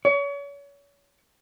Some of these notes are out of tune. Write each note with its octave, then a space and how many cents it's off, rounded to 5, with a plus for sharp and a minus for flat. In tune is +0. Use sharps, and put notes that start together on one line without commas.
C#5 +35